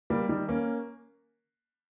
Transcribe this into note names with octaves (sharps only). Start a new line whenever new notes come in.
G3 A#3
D#3 G3
A#3 C#4